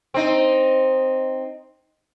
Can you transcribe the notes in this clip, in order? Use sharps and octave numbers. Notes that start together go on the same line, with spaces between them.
C4 D#4